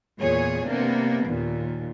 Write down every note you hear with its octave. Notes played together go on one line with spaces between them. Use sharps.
E2 A#2 G#4 C#5
C3 A#3 B3 D4
D#2 A#2